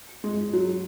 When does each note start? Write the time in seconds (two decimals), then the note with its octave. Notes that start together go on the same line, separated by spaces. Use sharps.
0.24 G#3
0.53 F#3